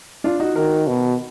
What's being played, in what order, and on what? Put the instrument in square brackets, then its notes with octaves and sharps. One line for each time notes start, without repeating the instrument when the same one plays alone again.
[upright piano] D4 F4
D#4 F#4
[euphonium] D#3 [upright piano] F#4 A#4
[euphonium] B2